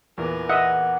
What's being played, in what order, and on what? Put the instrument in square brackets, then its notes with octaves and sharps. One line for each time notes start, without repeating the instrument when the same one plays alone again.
[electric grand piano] E2 A#2 E3 [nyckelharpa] A#4 B4
[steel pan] D#5 E5 [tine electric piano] F#5